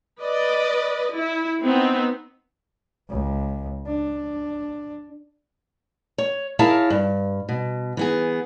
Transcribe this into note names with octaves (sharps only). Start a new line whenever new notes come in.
B4 D5 D#5
E4
B3 C4 D#4
C#2
D4
C#5
E4 G#4 A#4 C#5 F5 A5
G2
B2
E3 B3 G#4